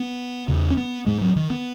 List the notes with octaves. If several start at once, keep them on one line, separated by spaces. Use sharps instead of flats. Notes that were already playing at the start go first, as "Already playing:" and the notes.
Already playing: B3
E2 C#3
C#4
B3
G#2 G#3
F#3
D#3
B3